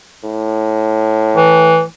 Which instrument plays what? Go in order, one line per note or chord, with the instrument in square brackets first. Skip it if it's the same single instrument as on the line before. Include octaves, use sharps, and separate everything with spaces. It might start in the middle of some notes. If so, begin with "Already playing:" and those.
[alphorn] A2
[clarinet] E3